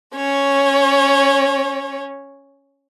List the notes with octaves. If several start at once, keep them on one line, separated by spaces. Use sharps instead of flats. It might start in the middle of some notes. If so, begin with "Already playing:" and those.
C#4 C#5